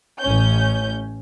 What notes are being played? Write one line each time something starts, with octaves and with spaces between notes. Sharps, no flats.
A1 C#4 G6